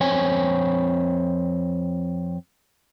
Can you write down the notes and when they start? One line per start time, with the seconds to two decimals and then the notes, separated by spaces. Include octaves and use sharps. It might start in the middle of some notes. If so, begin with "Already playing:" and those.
0.01 F2 C4 C#5 G#5